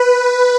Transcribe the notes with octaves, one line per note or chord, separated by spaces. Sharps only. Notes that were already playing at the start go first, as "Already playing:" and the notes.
Already playing: B4